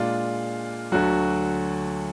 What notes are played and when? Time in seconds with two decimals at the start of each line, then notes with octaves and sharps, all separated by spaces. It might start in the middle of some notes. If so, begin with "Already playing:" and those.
Already playing: A#2 G#3 D4 F4
0.92 D2 D3 F#3 F#4